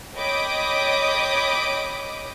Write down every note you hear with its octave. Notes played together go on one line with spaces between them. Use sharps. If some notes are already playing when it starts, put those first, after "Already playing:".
C#5 D#5 G5 B5 D6 D#6